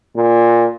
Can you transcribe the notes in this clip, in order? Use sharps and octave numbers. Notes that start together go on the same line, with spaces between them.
A#2